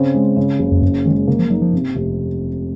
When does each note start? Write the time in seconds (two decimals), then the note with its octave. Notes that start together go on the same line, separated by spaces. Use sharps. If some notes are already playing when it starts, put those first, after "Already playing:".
Already playing: C#3 C4
0.14 G#3
0.37 C#3
0.59 F#1
0.71 F2
0.82 F#2 C#3
1.05 D#3 G#3
1.27 C#3 A#3
1.39 F3
1.50 F#3 D#4
1.61 F3
1.73 C3
1.95 F1